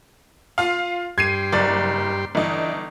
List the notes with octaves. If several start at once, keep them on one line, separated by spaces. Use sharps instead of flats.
F4 F5
G2 G4 C6 G#6 C7 D#7
F#1 D5 A6
G1 E3 D4 D#4